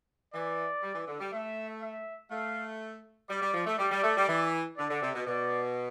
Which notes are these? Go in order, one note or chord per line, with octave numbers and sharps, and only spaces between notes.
E3 D5
G3
E3
D3
G3
A3 E5
E5
A3 F5
G3 D5
G3
F3
A3
G3 D5
G3
A3
G3
E3
D3 D5
D3
C3
B2
B2 D5